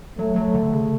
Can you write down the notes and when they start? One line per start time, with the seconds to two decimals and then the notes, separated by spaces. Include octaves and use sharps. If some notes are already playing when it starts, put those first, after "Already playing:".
0.19 F#3 A3
0.36 F#3
0.55 D3
0.73 C#3